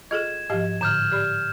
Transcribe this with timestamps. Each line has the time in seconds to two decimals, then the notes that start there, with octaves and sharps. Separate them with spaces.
0.11 F4 G#4 A4 D#5 G#6 E7
0.50 G#2 F3 G4 D#5 F5
0.81 A2 D3 F6 G6 E7
1.12 G4 D5 B5 F6